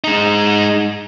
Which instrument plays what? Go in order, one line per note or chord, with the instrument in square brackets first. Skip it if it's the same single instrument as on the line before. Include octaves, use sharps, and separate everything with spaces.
[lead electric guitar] G#3 D#4